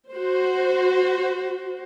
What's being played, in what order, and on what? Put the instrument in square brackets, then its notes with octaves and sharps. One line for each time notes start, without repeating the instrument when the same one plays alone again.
[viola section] F#4 C5